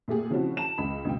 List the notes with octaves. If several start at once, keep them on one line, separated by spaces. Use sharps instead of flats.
A#2 A3 G4 G#4
C#3 F3 C4 C#4 E4 F#4
A5 E7
C#2 B5
C#2 B2 G5